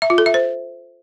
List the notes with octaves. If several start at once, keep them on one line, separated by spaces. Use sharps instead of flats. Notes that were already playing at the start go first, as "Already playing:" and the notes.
E5
F4
A4
E5
C5